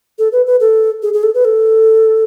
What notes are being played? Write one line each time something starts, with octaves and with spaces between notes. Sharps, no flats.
A4
B4
B4
A4
G#4
G#4
A4
B4
A4